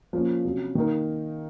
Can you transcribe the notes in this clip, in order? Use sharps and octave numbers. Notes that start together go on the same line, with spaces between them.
F3 A#3 C#4
C3 F#3 C#4
D#3 A#3 D#4 A#4